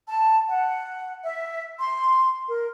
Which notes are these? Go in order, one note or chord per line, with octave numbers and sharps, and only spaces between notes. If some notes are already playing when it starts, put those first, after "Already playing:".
A5
F#5
E5
C6
A#4